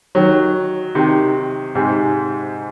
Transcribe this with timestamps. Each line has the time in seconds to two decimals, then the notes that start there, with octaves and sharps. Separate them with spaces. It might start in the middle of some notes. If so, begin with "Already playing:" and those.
0.15 D#3 F#3
0.95 C3 D#3
1.75 G#2 C3